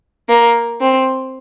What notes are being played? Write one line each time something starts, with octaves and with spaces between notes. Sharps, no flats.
A#3
C4